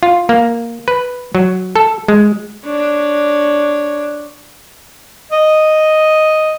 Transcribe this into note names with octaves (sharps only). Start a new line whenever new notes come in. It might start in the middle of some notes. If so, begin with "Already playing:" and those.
F4
A#3
B4
F#3
A4
G#3
D4 C#5
D#5